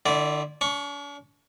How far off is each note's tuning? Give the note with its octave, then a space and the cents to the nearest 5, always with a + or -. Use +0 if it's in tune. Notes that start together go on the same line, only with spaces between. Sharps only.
D3 +35 E4 +0 D5 -20
D4 -45 C#6 +0